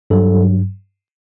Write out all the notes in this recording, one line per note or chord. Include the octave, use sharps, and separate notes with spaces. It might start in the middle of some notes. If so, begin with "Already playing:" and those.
G2 F#3 A4